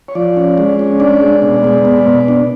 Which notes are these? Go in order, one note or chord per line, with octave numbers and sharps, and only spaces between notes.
C#5
F3 D5
C#4
G#3
C#4
D4 D5
G#3
B2
G#3
B3
B2
D4